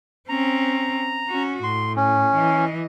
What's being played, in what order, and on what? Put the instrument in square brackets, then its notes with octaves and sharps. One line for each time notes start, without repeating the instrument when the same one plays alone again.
[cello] C4 C#4 [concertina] A#5
[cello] C#4 F#4
[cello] A2 [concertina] C6
[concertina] C#4
[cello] E3 D#5